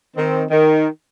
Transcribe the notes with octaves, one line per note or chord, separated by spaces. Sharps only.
D#3 C4
D#3